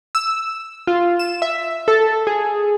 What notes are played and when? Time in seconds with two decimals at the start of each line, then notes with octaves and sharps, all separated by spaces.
0.15 E6
0.27 E6
0.87 F4
1.19 E7
1.42 E5
1.88 A4
2.27 G#4